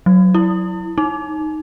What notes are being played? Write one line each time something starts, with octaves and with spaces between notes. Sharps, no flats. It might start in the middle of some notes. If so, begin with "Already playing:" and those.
F#3
E4
D#4